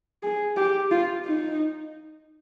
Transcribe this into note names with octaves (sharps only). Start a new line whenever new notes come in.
G#4
G4
F4
D#4